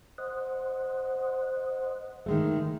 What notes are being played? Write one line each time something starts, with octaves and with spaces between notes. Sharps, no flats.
C5 D#5 F#5
D#3 G#3 A3